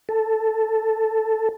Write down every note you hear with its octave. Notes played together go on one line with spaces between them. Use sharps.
A4